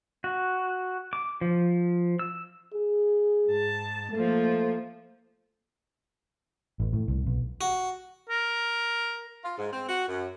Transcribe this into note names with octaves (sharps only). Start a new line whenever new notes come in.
F#4
D6
F3
E6
G#4
G#2 A5
F3 A3 A#3
A1
A2
C2
B1
F#4
A#4
F4
G#2
C4
F#4
F#2